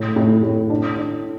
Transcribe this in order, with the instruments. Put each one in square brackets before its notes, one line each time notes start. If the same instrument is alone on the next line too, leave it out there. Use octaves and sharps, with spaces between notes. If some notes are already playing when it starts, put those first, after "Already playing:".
Already playing: [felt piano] A2
A2
A2
D4
D4